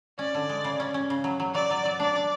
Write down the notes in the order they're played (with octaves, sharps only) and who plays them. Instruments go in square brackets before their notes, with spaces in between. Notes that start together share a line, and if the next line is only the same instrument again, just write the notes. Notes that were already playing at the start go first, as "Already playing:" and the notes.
[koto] C#4 [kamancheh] D5
[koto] D3
G#3
C#3
C#4
C#4
C#3
F#3
F#3
[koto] F#3 [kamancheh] D5
[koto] F#3
F#3
[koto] D4 [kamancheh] D5
[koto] D4